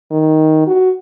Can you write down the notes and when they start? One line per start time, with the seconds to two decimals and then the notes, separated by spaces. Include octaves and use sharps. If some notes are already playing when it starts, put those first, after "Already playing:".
0.11 D#3
0.67 F#4